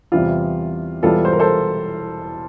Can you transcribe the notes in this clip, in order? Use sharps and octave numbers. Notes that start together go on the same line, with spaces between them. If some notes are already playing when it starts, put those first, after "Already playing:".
E2 C3 E3 G3 F4
E1 E2 E3 G3 F4 A4
C5
A#4
A4 C5